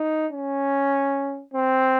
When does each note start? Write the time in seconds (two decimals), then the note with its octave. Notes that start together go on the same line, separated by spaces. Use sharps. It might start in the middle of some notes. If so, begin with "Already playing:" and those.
Already playing: D#4
0.32 C#4
1.54 C4